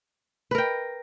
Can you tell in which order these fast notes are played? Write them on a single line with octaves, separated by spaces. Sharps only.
B4 A#4 G5